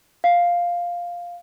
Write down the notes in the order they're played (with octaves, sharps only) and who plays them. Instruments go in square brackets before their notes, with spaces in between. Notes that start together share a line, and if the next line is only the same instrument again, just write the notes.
[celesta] F5